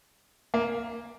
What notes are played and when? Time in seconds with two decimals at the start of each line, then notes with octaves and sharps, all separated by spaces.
0.54 A#3